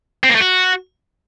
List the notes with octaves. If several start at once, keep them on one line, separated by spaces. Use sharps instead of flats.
C4
A#3
A3
F#4